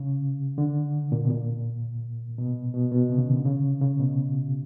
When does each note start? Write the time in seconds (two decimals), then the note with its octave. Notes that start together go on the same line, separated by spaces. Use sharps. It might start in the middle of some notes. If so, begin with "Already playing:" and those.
Already playing: C#3
0.58 D3
1.12 A#2
1.25 B2
1.30 A#2
2.38 B2
2.74 B2
2.92 B2
3.09 C3
3.18 C#3
3.28 D#3
3.37 D3
3.45 C#3
3.81 C#3
4.00 B2